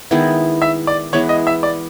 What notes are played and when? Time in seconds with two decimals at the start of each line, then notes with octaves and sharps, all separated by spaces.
0.11 D#3 G#3 B3 E4
0.62 E5
0.87 D5
1.13 E3 G#3 B3 C#5
1.29 D#5
1.47 E5
1.63 D5